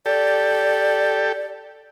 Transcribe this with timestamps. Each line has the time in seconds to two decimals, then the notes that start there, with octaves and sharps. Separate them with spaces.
0.06 G4 A4 D5